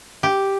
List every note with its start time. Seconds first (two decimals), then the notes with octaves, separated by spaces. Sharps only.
0.23 G4